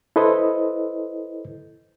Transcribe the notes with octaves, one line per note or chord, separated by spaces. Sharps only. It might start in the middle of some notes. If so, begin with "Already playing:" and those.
E4 A4 B4 C5 D#5